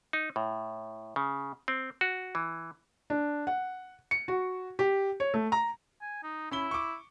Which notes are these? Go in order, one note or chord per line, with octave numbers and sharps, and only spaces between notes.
D#4
A2
C#3
C4
F#4
E3
D4
F#5
C#7
F#4
G4
C#5
A3
A#5
G#5
D#4
C#4 E4 B5 G7
C#6 D6